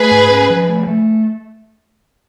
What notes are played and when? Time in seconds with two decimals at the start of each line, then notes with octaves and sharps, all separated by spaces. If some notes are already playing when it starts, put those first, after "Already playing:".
Already playing: A3 G#4 B4
0.11 G#2
0.30 C#4
0.50 F3
0.68 A3
0.87 A3